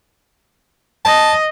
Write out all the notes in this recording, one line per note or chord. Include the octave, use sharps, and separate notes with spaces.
D#5 A5